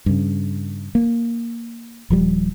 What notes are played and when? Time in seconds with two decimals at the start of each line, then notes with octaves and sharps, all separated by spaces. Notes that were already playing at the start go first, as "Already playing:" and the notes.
0.06 G2 C#3
0.95 A#3
2.10 D#1 F3 G3